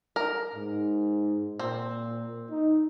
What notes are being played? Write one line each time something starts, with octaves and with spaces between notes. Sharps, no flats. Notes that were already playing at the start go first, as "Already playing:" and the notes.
A#4
G#2
A#2 C4
D#4